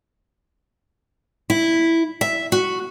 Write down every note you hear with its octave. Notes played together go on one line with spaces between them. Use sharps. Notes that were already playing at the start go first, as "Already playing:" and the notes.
E4
E5
F#4